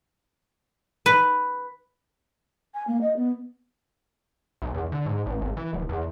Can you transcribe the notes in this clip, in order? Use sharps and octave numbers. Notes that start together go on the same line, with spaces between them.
B4
G#5
A#3
D#5
B3
B1
E2
D3
G#2
A1
G#1
E3
D1
E2